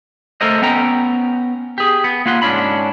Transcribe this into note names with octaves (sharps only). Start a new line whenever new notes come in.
A3 A4 A#4 C5 D#5
B3 C#4 G5 A#5
G4 G#4
B3
A#3 F4 F#5 C6
G#2 C#4 D4 B5